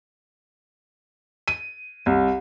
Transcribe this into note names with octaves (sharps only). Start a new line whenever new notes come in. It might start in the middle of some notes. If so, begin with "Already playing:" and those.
D#7
C2